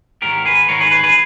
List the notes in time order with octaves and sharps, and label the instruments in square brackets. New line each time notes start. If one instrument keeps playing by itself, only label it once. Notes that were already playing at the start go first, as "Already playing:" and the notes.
[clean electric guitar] G#2 D#3 G4 A#4
G#4 B4
G#2 D#3 A#4 C#5
G#4 B4
G#4 B4
G#4 B4